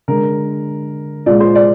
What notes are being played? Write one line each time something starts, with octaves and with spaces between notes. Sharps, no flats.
D3 G#3 A#4
A#2 G#3 D5
C5
D5